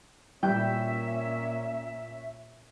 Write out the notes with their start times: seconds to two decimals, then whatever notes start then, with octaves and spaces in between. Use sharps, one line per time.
0.43 A#2 G3 C#4 E4 E5 G5